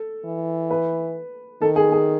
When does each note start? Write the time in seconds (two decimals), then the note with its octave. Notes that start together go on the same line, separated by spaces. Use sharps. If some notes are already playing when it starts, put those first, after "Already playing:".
Already playing: A4
0.25 E3
0.71 B4
1.62 D#3 A4
1.76 G#4
1.92 G#4